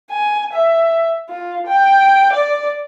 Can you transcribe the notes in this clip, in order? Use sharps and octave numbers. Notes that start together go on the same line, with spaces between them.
G#5
E5
F4
G5
D5